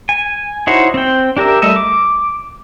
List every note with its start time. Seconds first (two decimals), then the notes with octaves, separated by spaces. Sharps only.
0.09 G#5
0.67 D#4 E4 F#4 C5 C#5
0.94 C4 G5
1.37 D4 G4 A#4 E5
1.62 G3 A3 D#5 E5
1.76 D6